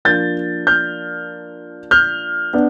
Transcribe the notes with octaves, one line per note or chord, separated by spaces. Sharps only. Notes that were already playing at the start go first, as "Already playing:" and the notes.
F3 A#3 D4 G6 A6
F6 G6
F6 G6
B3 D4